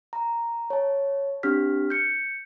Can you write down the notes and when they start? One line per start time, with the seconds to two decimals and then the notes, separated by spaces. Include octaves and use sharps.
0.13 A#5
0.70 C#5 A5
1.43 C4 D4 G4 F6 B6
1.90 G6 C#7